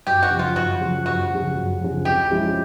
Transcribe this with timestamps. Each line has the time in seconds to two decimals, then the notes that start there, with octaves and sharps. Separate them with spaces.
0.07 F#2 G4
0.23 F#4
0.31 C#3 F3
0.39 F4
0.56 F#2 F#4
0.81 C#3 F3
1.06 F#2 F#4
1.31 C#3 F3
1.55 F#2
1.81 C#3 F3
2.05 C3 G4
2.31 F3 G#3 C#4 E4